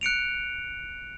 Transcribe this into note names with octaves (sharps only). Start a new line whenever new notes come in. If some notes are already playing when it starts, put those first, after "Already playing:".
F#6 C#7 D7 F7